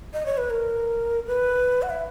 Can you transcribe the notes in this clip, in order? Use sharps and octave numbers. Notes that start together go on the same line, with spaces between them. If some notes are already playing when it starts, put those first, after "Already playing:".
D#5
C#5
B4
A#4
B4
F#5
E5